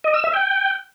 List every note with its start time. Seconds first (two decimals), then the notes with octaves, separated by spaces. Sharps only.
0.04 D#5
0.14 E6
0.24 E5
0.34 G5